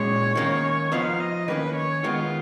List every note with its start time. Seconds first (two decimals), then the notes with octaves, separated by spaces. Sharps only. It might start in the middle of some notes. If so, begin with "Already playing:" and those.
Already playing: A#2 G#3 C#4 C#5
0.35 D#3 A#3 C#4
0.92 F3 B3 D#4 F5
1.20 D#5
1.48 D#3 A#3 C#4 B4
1.76 C#5
2.04 D#3 G#3 B3 F4